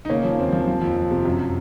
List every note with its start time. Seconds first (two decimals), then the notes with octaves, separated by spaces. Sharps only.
0.05 D#4
0.10 C#3 A#3 C#4
0.24 F3
0.38 D#2 C4
0.52 F3
0.67 F3
0.82 F2
0.96 F2
1.11 C3
1.25 F#2